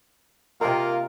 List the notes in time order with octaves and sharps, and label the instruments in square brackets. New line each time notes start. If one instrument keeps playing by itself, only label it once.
[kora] C3 D#4 [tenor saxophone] A#3 [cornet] F4 [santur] A#4